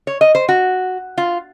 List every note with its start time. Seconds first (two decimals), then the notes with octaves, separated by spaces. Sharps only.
0.07 C#5
0.21 D#5
0.35 C5
0.49 F#4
1.18 F4